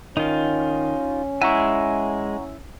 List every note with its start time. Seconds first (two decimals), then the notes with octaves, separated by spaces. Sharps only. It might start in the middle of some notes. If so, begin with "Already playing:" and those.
0.17 D#3 C#4 D#4 F4
1.42 G#3 E4 E5 F#5 G#5 A#5 C#6